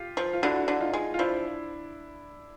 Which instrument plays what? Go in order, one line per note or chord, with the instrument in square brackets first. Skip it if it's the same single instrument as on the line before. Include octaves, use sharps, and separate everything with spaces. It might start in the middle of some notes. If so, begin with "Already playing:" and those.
Already playing: [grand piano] F4 G4
[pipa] F3
[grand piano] F4
[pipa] D3 [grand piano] E4 F#4
[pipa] D3
[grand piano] D#4 F4
[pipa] G#3
[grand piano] F4
[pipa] F3 [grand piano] D4 E4